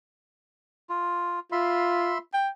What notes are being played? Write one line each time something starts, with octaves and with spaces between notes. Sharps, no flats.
F4
F4 E5 B5 C6
G5